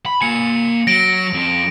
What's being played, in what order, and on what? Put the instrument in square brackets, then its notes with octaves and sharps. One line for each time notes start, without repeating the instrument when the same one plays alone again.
[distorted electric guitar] B5
[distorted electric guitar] A#3 G#5 [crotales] C#7
[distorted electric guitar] F#3 [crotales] A#6 D7
[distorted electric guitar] F2